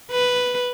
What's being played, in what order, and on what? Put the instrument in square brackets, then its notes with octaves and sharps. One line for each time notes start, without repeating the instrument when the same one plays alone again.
[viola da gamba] B4